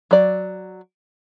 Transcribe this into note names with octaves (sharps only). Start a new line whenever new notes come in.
F#3 D5